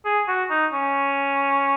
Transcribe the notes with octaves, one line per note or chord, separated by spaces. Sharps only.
G#4
F#4
D#4
C#4